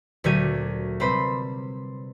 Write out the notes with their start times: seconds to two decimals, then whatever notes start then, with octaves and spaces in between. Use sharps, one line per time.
0.24 D2 A#2 F#3 G4 G#6 D#7
1.00 C3 G3 C4 B4 C5 B5